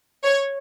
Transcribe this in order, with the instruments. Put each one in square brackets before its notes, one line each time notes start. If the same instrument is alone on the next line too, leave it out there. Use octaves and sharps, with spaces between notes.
[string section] C#5